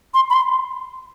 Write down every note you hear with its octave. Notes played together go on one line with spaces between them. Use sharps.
C6
B5
C6